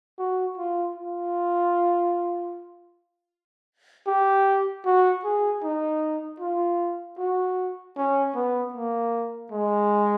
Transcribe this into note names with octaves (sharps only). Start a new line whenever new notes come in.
F#4
F4
F4
G4
F#4
G#4
D#4
F4
F#4
C#4
B3
A#3
G#3